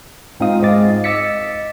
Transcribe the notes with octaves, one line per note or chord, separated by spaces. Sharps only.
G#2 C4 D#4 F4 F5 D#6
G#2 D#5 F5 D6 A6
D#5 D6 E6 A6 B6 C#7